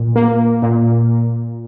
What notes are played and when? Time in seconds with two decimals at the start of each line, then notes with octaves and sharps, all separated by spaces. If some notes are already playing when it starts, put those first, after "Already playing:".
Already playing: A#2
0.16 A#3
0.62 A#2